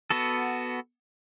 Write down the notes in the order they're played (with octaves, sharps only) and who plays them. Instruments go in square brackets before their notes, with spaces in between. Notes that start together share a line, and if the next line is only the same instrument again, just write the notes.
[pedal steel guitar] B3 F#4 A4